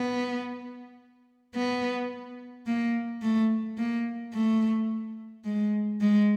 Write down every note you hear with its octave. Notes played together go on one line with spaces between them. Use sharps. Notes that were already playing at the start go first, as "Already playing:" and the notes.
Already playing: B3
B3
A#3
A3
A#3
A3
G#3
G#3